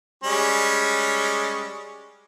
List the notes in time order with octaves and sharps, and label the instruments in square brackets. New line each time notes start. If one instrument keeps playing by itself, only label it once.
[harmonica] G3 G#3 C#4